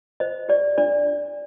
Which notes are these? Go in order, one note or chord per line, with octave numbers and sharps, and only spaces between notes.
C5 D#5
G4 D5
D4 D5
D4